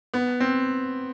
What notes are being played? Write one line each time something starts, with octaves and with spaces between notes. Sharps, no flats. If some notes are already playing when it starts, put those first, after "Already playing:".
B3
C4